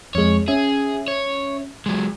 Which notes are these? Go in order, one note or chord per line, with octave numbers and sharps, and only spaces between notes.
F2 G#3 C#5
C#4 G#4 E5
C#5
F#3 G#3